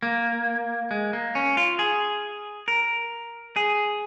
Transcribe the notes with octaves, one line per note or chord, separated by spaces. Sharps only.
A#3
G#3
A#3
C#4
F4
G#4
A#4
G#4